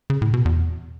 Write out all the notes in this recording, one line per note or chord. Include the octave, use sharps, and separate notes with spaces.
C#3
A2
B2
E2